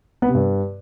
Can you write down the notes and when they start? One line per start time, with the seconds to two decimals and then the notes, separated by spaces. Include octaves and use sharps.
0.22 B3
0.28 C3
0.34 G2